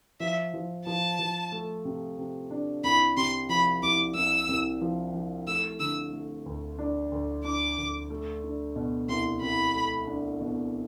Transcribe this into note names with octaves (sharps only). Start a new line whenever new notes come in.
F3 E5
F3
F3 A5
F3
A3
C3
C3
D4
C2 B5
C3 C6
F3 B5
C2 D6
C2 E6
C2
F3
F3
A3 E6
D3 E6
A3
D2
D4
D2
D4 D6
D2
A3
D4
B2
C2 C6
C2 B5
A3
D4
B2